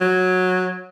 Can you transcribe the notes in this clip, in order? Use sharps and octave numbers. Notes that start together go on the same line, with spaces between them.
F#3